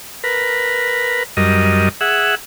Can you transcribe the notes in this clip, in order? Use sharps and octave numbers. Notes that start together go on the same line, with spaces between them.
A#4 B4
F#2 G3 A#4 D#5
G#4 E5 F#5